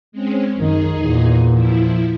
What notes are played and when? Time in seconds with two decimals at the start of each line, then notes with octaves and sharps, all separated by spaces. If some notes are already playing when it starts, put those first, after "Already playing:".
0.12 G#3 C4 C#4
0.56 F#2 D#3 D#4 G#4
1.00 E2 A#2
1.53 F3 E4